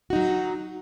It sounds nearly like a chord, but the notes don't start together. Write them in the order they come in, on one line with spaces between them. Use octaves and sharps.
F#4 D#4 F#3